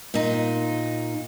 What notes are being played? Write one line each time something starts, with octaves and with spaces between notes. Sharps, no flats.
A#2 D#4